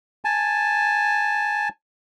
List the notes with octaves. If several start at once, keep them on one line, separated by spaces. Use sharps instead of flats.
G#5 A5